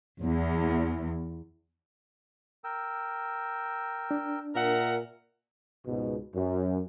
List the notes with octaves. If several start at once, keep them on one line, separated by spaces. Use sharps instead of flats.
E2
A#4 G5 E6
D4
A#2 A#4 E5 F#5
C#2 G#2 B2
F#2